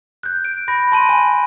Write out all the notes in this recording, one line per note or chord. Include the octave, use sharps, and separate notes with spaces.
F#6 G6
D7
B5 A#6
A5 C6 D#7
G#5